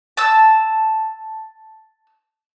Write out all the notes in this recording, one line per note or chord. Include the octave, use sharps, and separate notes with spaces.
A5 E6